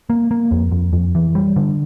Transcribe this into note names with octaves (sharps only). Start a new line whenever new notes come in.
A#3
A#3
F2
F2
F2
E3
G3
D3